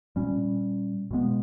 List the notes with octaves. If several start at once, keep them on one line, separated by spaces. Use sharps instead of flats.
A#2 G3 C#4
B2 G#3 B3